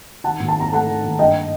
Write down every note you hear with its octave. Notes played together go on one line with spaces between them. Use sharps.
D#3 F#5 A5
D#2
A5
C4 A#5
A3 F#5 A5
D#3
D#2
G2 D#5 G5